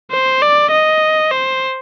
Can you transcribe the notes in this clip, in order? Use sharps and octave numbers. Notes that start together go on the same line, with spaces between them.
C5
D5
D#5
C5